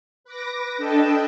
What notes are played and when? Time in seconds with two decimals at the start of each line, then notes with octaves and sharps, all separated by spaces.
0.24 B4 D6 A#6
0.77 D4 A4 B4 D#5 G5 A5